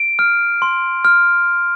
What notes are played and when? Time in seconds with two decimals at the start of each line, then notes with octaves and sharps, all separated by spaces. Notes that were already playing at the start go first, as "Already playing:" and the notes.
Already playing: D7
0.19 F6
0.62 C6
1.05 F6